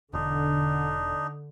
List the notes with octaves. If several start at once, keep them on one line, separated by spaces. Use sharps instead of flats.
E1 D3 D4 D#4